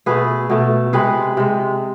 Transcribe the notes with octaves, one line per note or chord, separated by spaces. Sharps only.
B2 A3 G#4 B4
B2 A3
C3 G#3 G#4 B4
C3 G#3